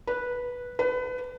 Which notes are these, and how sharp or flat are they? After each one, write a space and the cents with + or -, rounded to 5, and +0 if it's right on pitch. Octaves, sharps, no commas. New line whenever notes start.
B4 -10
B4 +25